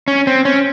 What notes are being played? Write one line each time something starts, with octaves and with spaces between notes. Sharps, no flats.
C#4
C4
C#4